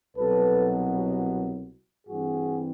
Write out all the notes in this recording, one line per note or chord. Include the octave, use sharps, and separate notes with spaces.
C2 B2 F#3 A4 B4
G2 E3 G3 C4 F#4 G#4